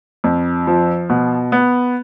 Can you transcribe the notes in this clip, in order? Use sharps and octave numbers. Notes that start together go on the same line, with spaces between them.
F2
F3
B2
B3